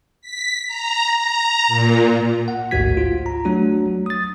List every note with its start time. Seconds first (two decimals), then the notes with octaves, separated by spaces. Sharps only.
0.21 B6
0.67 A#5
1.16 A#5
1.68 A#2
2.48 F#5
2.71 A1 D2 G#2 F#4 G#6 B6
2.97 F4
3.26 A#5
3.45 F#3 A3 D4 F#4
4.06 D#6 A6